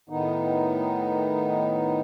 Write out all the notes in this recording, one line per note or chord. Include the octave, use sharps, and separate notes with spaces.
A2 D#3 B3 D#4